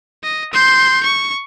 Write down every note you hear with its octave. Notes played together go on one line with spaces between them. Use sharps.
D#5
C6 G6
C#6